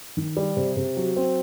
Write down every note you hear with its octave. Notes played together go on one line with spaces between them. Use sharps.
D#3
G3
C3
C3
F#3
C4